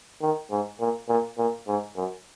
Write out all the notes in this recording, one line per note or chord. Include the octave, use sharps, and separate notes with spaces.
D#3
G#2
A#2
A#2
A#2
G#2
F#2